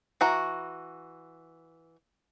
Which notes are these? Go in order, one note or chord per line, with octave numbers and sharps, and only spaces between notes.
E3 F#4 A#5